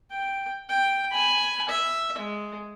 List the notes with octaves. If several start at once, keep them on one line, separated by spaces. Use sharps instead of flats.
G5
G5
G#5 B5
E5
G#3